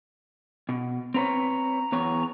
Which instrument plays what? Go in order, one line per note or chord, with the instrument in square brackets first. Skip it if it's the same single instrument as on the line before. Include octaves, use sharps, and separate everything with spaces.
[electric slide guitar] B2
[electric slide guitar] C4 B4 C#5 [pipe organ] A#5
[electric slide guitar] E2 B3 C#5